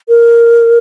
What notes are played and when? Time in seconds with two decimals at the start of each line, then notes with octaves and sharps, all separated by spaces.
0.08 A#4